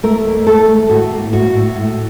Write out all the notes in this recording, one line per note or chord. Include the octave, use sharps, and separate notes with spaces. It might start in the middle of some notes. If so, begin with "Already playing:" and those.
A3 A#4
D#2
A3 A4
A3
A2 F#4
A#3
A2 F#4
A2
A2